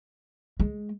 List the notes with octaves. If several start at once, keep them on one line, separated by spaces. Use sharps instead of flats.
G#3